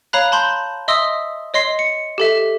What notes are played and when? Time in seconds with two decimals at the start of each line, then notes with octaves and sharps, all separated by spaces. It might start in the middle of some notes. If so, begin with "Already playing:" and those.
0.13 C#5 F5 A#5 B5 F#6
0.32 A5 B5 C6 G6
0.88 D#5 E5 C6 D#6 E6
1.54 C#5 D#5 C6 C7
1.79 C#7
2.18 G4 A4 E5